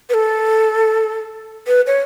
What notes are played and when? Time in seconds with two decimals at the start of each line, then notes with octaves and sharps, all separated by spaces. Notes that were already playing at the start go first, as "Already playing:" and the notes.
0.10 B4
0.14 A4
1.67 B4
1.87 C#5